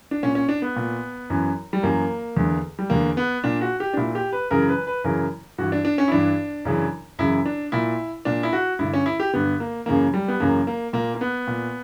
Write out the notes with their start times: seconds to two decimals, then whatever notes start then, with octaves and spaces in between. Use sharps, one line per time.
0.11 D4
0.23 A#2 C#4
0.35 C#4
0.49 D4
0.62 B3
0.76 A#2
1.30 F#2 E3
1.73 G3
1.83 F#2 E3 A#3
2.37 E2 D3
2.79 G3
2.90 E2 D3 A#3
3.17 B3
3.44 A#2 D4
3.61 F#4
3.80 G4
3.93 D4
3.97 A#2 E4
4.15 G4
4.33 B4
4.51 F#2 C#3 E3 A#4
4.69 B4
4.87 B4
5.04 F#2 C#3 E3 A#4
5.58 G2 E3 F#4
5.72 D4
5.85 D4
5.98 C#4
6.08 E4
6.12 G2 E3 D4
6.65 F#2 C#3 E3
7.19 F#2 C#3 E3 E4
7.46 D4
7.72 A#2 E4
8.25 A#2 D4
8.43 E4
8.53 F#4
8.79 G2 D3 E4
8.93 C#4
9.06 E4
9.20 G4
9.33 G2 D3 B3
9.60 A#3
9.86 F#2 C#3 E3 A#3
10.14 G3
10.28 B3
10.40 F#2 C#3 E3 A#3
10.67 A#3
10.93 A#2 A#3
11.15 A#3
11.21 B3
11.47 A#2